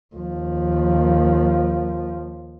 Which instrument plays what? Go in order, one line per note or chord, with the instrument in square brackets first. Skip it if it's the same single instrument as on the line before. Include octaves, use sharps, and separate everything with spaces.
[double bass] D#2 F3